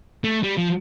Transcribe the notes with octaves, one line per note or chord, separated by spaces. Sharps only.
A3
G3
F3